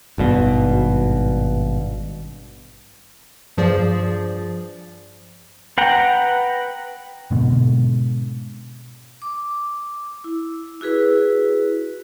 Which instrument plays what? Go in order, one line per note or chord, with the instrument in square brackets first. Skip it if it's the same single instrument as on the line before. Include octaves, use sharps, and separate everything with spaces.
[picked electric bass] G#1 G2 B2
[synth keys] G2 F3 G#4 D5
[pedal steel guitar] B4 F#5 G5 A#5
[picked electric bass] G#2 B2 D3
[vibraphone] D6
E4
E4 F#4 G#4 B4